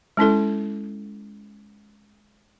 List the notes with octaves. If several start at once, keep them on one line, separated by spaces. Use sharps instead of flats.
G#3 C#4 E4 A4